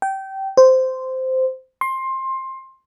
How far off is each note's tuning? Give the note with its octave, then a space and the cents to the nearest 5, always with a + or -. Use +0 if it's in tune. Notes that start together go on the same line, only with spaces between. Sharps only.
G5 -20
C5 -10
C6 +20